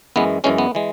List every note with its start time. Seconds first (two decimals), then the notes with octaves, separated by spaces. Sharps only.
0.16 F#2 E3 G#3 B3
0.44 F#2 E3 G#3 C#4
0.58 B3
0.75 E3 G#3